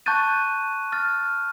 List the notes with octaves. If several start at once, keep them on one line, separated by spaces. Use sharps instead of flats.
A5 C#6 F#6 G6 A6 D#7
F6 A6